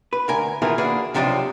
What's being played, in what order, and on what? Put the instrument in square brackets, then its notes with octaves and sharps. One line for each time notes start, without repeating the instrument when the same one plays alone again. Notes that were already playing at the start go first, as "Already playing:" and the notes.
[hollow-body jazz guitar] B4
D2 A#4 G#5
B2 D#3 E3 F4 G#4 A#4
A#3 D4 F#4 G#4 B4
B1 C3 F3 D4 F4 D#5